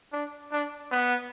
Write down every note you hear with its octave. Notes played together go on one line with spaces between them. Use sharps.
D4
D4
B3